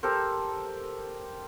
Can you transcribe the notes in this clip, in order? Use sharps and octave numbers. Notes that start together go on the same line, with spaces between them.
G4 A4 A#4 C5